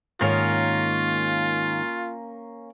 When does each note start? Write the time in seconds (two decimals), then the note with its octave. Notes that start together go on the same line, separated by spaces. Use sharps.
0.21 G#2 D#3 A#3 C#4 F4 A#4 C#5